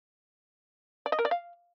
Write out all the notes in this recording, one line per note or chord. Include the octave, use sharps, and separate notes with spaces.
D5
D#5
A#4
D5
F5